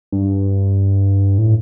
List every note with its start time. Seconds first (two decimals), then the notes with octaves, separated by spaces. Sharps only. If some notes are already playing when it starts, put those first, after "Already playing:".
0.12 G2
1.38 A2